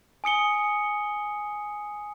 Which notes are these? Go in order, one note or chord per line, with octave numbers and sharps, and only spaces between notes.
G#5 D#6 C#7 G7